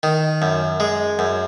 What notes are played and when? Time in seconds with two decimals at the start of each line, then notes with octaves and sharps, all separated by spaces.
0.03 D#3
0.42 F#2
0.80 G#3
1.19 F#2